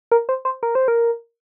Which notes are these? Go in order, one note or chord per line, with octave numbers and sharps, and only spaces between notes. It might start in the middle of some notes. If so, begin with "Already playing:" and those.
A#4
C5
C5
A#4
C5
A#4